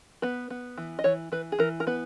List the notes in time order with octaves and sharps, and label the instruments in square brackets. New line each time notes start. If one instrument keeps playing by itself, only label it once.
[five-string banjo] B3 B4
B3
E3
D#5
E3 C#5
E3 B4
G#4
E3 A#4
A#4
B3 B4